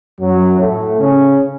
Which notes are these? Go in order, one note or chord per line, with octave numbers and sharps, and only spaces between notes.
F#2 F#3
A2 A3
C#3 C#4